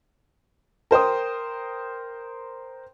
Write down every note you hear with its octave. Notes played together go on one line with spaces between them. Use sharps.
A#4 C5 G5 D#6